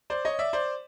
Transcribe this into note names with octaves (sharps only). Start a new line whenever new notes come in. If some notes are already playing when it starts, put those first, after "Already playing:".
C5 D5
C#5 D#5
D5 E5
C5 D5